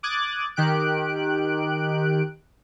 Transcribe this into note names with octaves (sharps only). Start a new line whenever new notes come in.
D6 D#6 F#6 G#6 A6
D#3 G4 F#6 D7